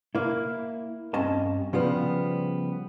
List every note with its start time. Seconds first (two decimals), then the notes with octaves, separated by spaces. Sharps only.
0.15 A#3 E4
1.14 G2 C4 C#4 D#5 G#5 A5
1.73 C#3 F3 G3 B3